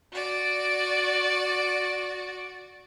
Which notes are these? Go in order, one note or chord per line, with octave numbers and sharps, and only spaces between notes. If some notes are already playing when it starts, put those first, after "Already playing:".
F#4 D5